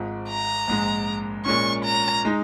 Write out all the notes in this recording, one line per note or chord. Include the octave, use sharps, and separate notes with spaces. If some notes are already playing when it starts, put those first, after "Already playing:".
Already playing: G#1 G#2 F3
A#5
A#1 G#2 G#3
A#2 G#3 C#4 C#6
A#5
G#3 D#4